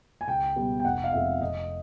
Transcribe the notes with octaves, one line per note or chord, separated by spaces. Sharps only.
G#5
C#2 G5
B2 G3 B3
G5
F1 F#5
F5
F2 C3 F3 G#3 E5
F1 D#5